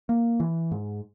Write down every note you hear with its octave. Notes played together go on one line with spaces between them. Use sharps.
A#3
E3
G#2